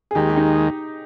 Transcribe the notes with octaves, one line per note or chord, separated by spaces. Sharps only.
G#4
D#2 D#3 G#3 G4
G4
D#4